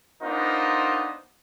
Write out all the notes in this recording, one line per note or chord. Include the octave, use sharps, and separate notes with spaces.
B3 D4 D#4 F4 A#4 C5